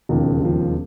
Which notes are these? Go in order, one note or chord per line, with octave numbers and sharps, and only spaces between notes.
E1 D#2 C#3 F3
E1 D#2 C#3 F3